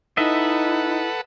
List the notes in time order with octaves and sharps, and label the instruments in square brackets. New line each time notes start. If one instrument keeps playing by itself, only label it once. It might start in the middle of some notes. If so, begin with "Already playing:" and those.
[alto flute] D#4 [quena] E4 [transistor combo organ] A4 B4 F#5 [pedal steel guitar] D#5 E5